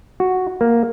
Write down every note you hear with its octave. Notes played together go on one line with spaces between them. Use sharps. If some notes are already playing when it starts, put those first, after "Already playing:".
F#4
A#3